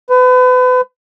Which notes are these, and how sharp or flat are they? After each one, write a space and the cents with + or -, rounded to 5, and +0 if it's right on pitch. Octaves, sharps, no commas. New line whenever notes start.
B4 +35